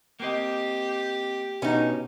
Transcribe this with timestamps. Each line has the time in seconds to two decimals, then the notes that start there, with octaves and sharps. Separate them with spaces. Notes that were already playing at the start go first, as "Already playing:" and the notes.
0.20 A#3 C4 G4 D#5
1.62 B2 C#4 D#4